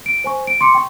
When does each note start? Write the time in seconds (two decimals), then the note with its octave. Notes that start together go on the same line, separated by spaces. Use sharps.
0.06 D7
0.24 C5 G#5 C#6
0.47 D7
0.61 C6 D6 C#7
0.75 G5 C#6